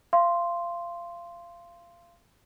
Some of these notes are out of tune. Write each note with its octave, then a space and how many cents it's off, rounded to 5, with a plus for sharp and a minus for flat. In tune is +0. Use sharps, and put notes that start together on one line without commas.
F5 -25 C6 +0